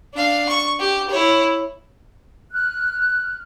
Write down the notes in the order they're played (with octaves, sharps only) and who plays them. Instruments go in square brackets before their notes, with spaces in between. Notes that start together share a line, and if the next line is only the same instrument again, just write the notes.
[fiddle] D4 F5
C#6
G4
E4 C#5
[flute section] F6 F#6